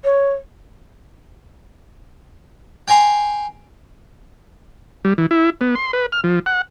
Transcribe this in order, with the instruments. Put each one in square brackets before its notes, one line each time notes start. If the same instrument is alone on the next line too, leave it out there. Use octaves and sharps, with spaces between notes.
[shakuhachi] C#5
[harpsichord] G5 G#5 A#5 C6
[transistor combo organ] G3
E3
E4
B3
C6
B4
F6
F3
F#5